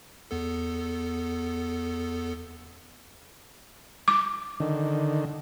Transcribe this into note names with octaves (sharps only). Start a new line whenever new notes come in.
E2 B3 A4
D6
D3 D#3